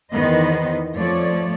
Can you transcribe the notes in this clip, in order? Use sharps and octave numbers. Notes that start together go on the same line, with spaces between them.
E2 D#3 B3 C5 D#5
F2 F3 A3 C#5 D5